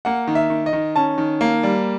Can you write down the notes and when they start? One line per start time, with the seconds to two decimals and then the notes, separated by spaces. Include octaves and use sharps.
0.05 A#3 F#5
0.27 D#3
0.35 E5
0.50 D#3
0.66 D#5
0.73 D#3
0.96 C#4 A5
1.18 D#3
1.41 A#3
1.63 G3